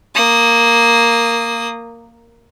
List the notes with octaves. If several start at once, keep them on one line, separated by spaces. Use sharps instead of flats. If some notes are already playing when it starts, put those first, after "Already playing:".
A#3 D#6